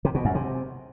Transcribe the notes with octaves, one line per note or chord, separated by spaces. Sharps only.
C3
B2
F#2
C3